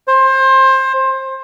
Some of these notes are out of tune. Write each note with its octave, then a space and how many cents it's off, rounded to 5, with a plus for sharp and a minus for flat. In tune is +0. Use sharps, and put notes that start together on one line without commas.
C5 +25